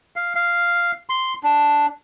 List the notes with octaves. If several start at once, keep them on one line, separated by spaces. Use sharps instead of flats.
F5
F5
C6
D4